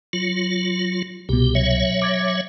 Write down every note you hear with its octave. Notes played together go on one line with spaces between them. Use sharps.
F#3 F4
C2 B2 G4
F#3 C#5 E5
D6 G#6 A6